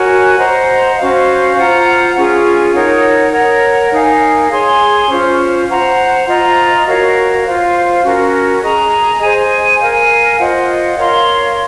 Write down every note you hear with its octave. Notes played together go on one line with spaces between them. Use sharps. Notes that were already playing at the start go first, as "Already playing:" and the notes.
Already playing: F#4 A#4 C#5 G#5
C5 D#5 F#5 A#5
C#4 F#4 C5 F5
F4 C5 F#5 A#5
C#4 F4 G#4
D#4 A#4 C#5 F#5
A#4 C#5 F#5
D#4 A#4 F5 G#5
G#4 C#5 G#5 C6
C#4 F4 C5
C5 F#5 A#5
F4 C5 D#5 A#5
F#4 A#4 C#5 F5
F4 C5 F5
C#4 F#4 A#4
G#4 D#5 A#5
G#4 C5 D#5 G#5
A#4 F5 G#5
F4 C5 D#5 F#5
A#4 C#5 F5 C6